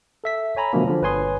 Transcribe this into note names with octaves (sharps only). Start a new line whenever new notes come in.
A4 E5 B6
C#5 G#5 A#5 B5
B2 D3 F3 F#3 A3 A#3
D3 F3
G1 B4 C#5 G#5 C6 D#6